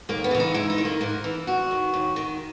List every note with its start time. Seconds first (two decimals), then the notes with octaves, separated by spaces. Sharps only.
0.09 D#2 A#3
0.24 B3
0.31 C#3 E3
0.40 D#4
0.54 G#2 E4
0.70 D#4
0.78 D#3
0.85 A#3
1.01 G#2 A#3
1.24 E3
1.47 E2 F#4
1.71 D#3
1.94 D#2
2.16 D#3